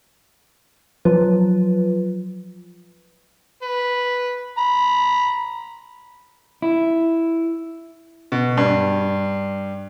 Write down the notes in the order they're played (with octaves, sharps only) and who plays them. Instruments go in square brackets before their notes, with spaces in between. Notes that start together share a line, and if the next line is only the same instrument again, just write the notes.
[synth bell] F3 F#3 F4 B4
[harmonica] B4
A#5 B5
[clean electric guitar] E4
[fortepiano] B2
G2